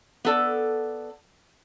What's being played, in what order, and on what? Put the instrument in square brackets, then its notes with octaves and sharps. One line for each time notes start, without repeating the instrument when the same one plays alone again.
[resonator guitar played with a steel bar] B3 A4 D5